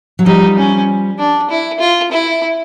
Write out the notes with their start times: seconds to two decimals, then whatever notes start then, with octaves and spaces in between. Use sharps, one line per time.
0.19 F#3
0.26 F3 G3 D#4
0.58 C#4
1.19 D4
1.50 E4
1.80 F4
2.11 E4